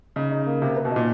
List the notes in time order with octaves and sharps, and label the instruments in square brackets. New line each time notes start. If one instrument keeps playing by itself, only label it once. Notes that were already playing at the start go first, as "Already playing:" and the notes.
[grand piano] C#3 [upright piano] D#4
[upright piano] D#4
A#3
[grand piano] C3 [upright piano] A#3
[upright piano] B4
[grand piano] B2
[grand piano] A#2 [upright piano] D#4